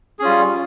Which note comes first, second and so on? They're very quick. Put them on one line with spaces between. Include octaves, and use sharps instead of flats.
G#4 C#4 F4 G3